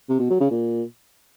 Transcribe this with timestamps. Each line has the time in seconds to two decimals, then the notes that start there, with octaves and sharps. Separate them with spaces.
0.09 C3
0.20 B2
0.30 F#3
0.40 C#3
0.51 A#2